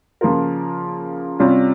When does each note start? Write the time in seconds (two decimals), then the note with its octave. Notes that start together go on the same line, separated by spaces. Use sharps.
0.21 C#3 F3 A#3 F4 A#4
1.39 C3 G3 C#4 F4